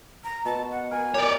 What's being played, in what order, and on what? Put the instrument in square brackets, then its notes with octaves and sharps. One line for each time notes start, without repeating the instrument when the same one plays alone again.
[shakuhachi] A#5
[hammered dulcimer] B2 [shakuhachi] A5
[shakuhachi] F#5
[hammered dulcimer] A#4 [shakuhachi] G#5
[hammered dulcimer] G4 A#4 [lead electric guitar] C#5 D5